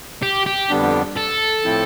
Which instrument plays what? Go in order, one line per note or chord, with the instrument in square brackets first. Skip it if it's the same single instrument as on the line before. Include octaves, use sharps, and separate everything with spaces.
[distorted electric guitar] G4
G4
[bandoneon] F2 D3 G3 B3 D4
[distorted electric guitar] A4
[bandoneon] A2 F3 C4 E4